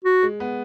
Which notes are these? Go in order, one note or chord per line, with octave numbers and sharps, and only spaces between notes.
F#4
G#3
B3